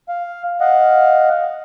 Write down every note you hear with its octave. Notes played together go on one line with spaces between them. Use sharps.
F5
D#5 F5 F#5